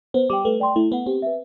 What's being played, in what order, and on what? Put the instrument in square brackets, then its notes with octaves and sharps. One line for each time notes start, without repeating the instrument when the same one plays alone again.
[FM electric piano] B3 [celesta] C5
[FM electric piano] G3 [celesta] D6
[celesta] G5
[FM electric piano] A3 [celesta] B4
[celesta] D5 G5 C6
[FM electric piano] A3 [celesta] E4
[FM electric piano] B3 [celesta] B4 F#5
[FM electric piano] C4 [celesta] G4
[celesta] B4 E5